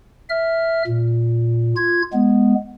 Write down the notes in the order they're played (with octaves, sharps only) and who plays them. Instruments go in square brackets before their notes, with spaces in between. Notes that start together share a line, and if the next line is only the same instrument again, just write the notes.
[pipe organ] E5 F6
A#2
F4 G#6
G#3 B3